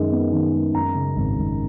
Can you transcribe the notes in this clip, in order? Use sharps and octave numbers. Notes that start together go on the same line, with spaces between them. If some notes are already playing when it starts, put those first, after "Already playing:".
Already playing: F#2 D#3 G#3
B3
D#3
G#3
F#2 A#5
C#3
G#1
G#1